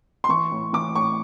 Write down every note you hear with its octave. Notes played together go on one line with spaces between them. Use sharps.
C6
E3 C#6
A2
E3 D6
A2 C#6